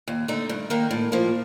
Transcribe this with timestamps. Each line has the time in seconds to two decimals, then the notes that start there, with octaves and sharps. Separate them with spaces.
0.08 D#2
0.28 D3 A3 D#4
0.49 G2
0.70 D#3 A#3 D#4
0.91 A2
1.12 F3 A#3